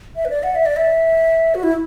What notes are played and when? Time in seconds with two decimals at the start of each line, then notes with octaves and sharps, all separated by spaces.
0.16 E5
0.25 B4
0.30 D5
0.43 F#5
0.55 E5
0.66 D5
0.76 E5
1.55 F#4
1.63 E4